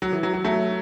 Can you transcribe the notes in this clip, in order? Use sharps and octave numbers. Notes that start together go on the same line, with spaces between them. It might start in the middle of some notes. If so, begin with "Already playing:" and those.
F#3
E3
F#3
F#3
F#3 A3